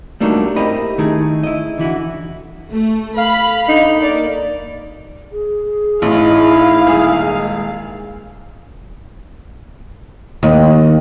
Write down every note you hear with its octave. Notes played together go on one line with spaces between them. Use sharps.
G3 A3 A#3 D4 D#4 F#4
C4 E4 G4 A#4 D#5 B5
D#3 A3 D#4 E4 G#4
E4 D#5
D3 E3 E4 F#4
A3
F5 B5
D3 D#4
A#3 D5
G#4
A1 A2 D#4 E4 F5
D#1 G#3 G#4 D#6
D#2